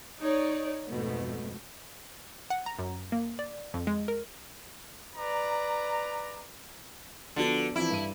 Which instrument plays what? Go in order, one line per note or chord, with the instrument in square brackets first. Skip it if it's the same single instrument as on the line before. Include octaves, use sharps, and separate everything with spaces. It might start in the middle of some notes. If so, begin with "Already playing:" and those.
[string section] D#4 C#5 D5
F2 G#2 B2 A3
[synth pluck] F#5
A#5
F#2
A#3
D5
F2
G#3
A#4
[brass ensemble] B4 D5 A#5
[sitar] D3 [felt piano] F3 B3 F#4
[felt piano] E3 F3 C4 [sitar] E4
[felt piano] G2 D#7